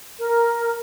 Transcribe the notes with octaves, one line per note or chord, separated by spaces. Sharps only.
A#4